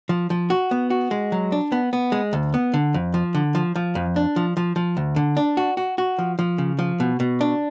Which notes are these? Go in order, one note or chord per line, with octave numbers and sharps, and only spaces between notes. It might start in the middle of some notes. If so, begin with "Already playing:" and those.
F3
F3
F#4
B3
F#4
G#3
F#3
D4
B3
B3
G#3
D2
B3
D3
F2
F3
D3
F3
F3
F2
D4
F3
F3
F3
D2
D3
D4
F#4
F#4
F#4
F3
F3
C#3
F3
B2
B2
D4